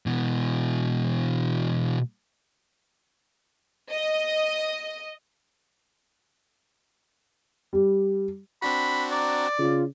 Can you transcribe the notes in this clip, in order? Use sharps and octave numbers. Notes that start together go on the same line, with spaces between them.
B2 E3
D#5
G3
C4 D4 F#4 B5
D5 A#5
C#3 F4